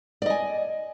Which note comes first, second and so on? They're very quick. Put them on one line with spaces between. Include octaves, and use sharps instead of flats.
D5 D#5 G#5